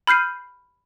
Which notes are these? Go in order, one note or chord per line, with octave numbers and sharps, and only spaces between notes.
B5 F6 G6 C7 D#7